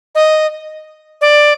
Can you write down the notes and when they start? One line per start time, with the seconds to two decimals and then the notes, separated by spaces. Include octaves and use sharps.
0.15 D#5
1.21 D5